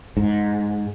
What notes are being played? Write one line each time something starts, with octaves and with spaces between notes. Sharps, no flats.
G#2